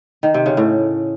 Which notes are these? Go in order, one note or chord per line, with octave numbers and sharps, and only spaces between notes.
D#3
C3
C#3
A2